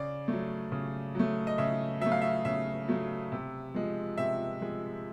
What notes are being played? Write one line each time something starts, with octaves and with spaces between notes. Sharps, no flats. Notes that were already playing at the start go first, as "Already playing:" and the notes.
Already playing: C#3 D5
F#3 A3
C#3
F#3 A3
D#5
C#3 E5
F#3 A3 E5
F5
E5
C#3 E5
F#3 A3
C3
F3 G#3
C3 E5
F3 G#3